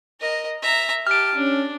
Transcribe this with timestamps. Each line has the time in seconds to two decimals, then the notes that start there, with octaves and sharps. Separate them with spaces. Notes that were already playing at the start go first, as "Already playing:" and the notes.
0.20 A#4 D#5
0.62 E5 A#5
1.07 G4 A5 F6 D7
1.36 C#4 D4